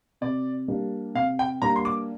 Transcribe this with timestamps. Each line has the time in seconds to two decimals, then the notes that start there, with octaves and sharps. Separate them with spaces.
0.21 C3 D5
0.68 G3 A#3 D4
1.15 C3 F5
1.39 G5
1.62 G3 A#3 D4 A#5
1.76 C6
1.85 D6